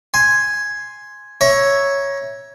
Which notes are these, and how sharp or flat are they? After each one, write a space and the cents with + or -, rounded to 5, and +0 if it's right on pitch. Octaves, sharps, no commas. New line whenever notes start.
G#5 +0 C6 +0
C#5 +0 E5 +0 A#5 +30